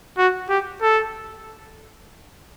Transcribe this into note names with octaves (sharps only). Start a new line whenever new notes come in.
F#4
G4
A4